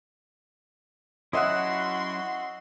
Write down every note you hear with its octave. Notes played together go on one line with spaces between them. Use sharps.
F#3 C#4 E4 F#4 D#5 E5 F#5 C6